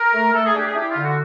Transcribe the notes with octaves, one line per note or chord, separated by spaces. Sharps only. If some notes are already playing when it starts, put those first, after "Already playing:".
Already playing: A#4
A3
A3 A4
G#4
D4 G4
G#4
E4 G4
F4
D3
F#4